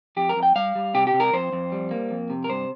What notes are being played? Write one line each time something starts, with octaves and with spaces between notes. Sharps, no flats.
F2 G4
A#4
F2
G5
G3 F5
G3
C3 G4
G4
C3
A#4
F2 C5
F2
G3
A#3
F2
C3
A#4
G2 C5